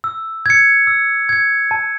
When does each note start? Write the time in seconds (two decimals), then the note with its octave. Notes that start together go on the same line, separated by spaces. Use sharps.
0.04 E6
0.46 G#6 C#7
0.87 E6
1.29 G#6 C#7
1.71 A5